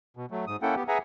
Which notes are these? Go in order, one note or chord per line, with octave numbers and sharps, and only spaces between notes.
B2
F#3 A3
G#2 D#6
A#3 C#4 E4 A4 F#5 G5
B3 G4
G#4 B4 E5 F#5 G#5 A#5